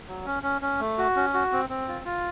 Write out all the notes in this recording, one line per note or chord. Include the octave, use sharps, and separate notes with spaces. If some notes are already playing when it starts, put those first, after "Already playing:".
F#3
C#4
C#4
C#4
A3
F#4
C#4
F#4
C4
C4
F4
F4